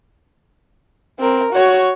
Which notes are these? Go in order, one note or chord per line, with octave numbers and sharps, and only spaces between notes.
C4 A#4
F#4 C#5